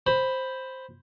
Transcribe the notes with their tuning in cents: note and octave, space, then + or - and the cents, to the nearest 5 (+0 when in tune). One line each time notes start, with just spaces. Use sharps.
C5 +5 B5 +0